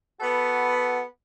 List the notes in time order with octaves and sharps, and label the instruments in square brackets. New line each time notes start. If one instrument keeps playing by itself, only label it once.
[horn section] B3 F#4 A4 B4